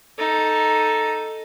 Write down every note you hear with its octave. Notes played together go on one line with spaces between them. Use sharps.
D#4 A4